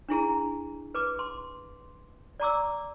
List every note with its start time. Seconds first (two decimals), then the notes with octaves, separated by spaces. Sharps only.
0.09 D4 E4 G#4 A#5
0.95 B4 D6
1.19 C6
2.40 D5 A#5 D6 E6